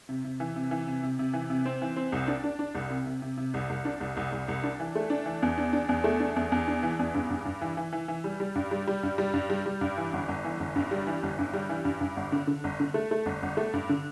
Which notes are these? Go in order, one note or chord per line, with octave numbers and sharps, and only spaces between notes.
C3
C3
E3
C3
E3
C3
C3
C3
E3
C3
C4
E3
C4
C2
D4
D4
D4
C2
C3
C3
C3
C3
C2
C2
D4
C2
C2
C2
C2
D4
E3
A3
D4
E3
E2
D4
D4
E2
A3
D4
E2
E2
D4
E3
E2
G2
G2
G2
E3
E3
E3
E3
G3
G3
G2
G3
G3
G2
G3
G2
G3
G3
G2
E3
G1
G1
E3
G1
G2
G3
E3
G1
G2
G3
E3
G2
G2
G1
D3
D3
G1
D3
A3
A3
G1
G1
A3
G2
D3